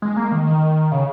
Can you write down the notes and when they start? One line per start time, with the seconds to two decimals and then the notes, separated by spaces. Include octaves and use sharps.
0.02 G#3
0.17 A#3
0.31 D#3
0.47 D#3
0.92 C#3